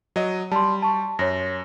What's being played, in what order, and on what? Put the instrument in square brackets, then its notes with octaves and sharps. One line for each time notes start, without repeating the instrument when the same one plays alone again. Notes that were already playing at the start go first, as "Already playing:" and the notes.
[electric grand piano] F#3 D#5
[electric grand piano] G3 [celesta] A5 C6
[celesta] A5 C#6
[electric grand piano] F#2 [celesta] C#5 A#6